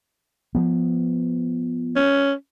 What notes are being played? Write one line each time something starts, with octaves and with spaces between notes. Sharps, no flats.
F3 B3
C#4